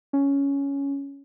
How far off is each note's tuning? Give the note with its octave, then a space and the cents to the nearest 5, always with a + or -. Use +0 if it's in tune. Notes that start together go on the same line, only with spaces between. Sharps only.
C#4 +10